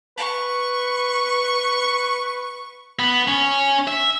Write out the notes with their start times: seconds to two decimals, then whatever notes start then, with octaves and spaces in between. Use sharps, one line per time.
0.17 B4 C#6
2.99 B3
3.28 C#4
3.88 E5